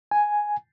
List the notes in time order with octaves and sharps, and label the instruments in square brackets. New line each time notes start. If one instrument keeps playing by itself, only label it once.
[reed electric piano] G#5